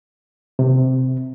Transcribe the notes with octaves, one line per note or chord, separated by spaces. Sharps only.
C3